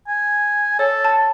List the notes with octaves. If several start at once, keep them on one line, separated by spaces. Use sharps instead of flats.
G#5
A4 C#5
A5